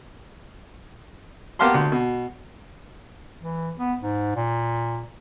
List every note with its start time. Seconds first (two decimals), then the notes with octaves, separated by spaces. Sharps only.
1.59 A#3 B3 G4 F5 A5 C6
1.74 D2
1.92 B2
3.41 E3
3.78 B3
4.00 G#2
4.35 A#2